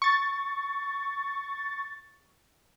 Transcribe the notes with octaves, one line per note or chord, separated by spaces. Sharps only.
C#6 A6